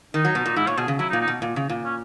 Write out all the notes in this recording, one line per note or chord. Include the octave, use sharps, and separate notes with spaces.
D#3 D#4
F#3
B2
A#2
G#2 E4
A#2 C#5
B2 G#4
C#3
F#3 E4
D#4
A#2
D#4
B2
A#2
C#3
A#2
C#4